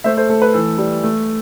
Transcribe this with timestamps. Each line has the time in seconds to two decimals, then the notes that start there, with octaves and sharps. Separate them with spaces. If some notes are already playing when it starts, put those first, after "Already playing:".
0.04 A3 C5 E5
0.17 A4 C5
0.29 A3 A4
0.42 B4
0.54 E3 A4
0.78 G3
1.03 A3